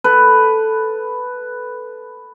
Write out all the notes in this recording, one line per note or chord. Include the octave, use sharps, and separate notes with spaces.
A4 B4